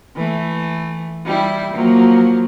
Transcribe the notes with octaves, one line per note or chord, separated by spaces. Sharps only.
E3 A3
G3 E4
F3 F#3 A#3